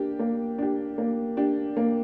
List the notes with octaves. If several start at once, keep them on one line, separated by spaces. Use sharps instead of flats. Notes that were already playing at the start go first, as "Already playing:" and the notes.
Already playing: A#3 D4 G4
A#3
D4 G4
A#3
D4 G4
A#3